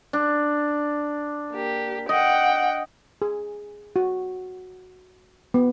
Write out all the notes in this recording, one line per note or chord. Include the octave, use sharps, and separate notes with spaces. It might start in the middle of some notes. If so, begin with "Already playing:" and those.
D4
A#3 G4
D#5 F#5 G5
G#4
F#4
B3